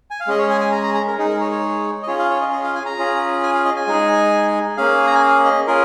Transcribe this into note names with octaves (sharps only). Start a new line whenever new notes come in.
G#5
F5
G#3 C#4 G#4 D#5
C#5
G#5
G#5
A#5
A#5
A#5
A#4
G#3 D#4 G#4
A#4
C#5
C#5
D#5
C#4 F4 G#4 C#5
F5
C#5
D#5
D#5
F5
G#5
A#5
C#4 F4 G#4
G#5
F5
D#5
G#5
G#3 D#4 G#4
A#3 C#4 G#4 F5
A#5
G#5
F5
D#5
C#4 F4 G#4 A#4